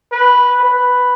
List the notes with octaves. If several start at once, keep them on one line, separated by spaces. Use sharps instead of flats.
B4
B4